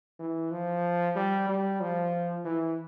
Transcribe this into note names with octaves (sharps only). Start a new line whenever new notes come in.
E3
F3
G3
G3
F3
E3